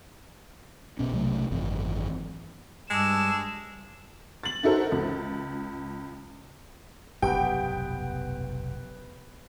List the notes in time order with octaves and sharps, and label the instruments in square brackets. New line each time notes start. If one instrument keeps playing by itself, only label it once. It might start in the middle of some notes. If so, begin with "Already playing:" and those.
[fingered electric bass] B1 B2 C#4
B1 C3 F#3 A3
G#1 F#2 E3 C4
[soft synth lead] G2 [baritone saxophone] G#3 [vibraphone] A5 D6 E6 [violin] E7
[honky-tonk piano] A6 F#7
D#4 E4 F#4 A4 A#4 C5
C#2
[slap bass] F1 B1 G2 [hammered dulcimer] B3 B4 [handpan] G4 [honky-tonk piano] G5